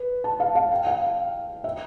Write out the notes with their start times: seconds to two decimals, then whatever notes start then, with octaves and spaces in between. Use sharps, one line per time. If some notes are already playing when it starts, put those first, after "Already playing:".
Already playing: B4
0.24 A5
0.40 F5
0.55 F5
0.71 G5
0.87 F5
1.64 E5